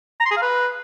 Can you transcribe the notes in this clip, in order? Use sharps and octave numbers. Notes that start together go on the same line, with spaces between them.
A#5
C6
G#4
F5
B4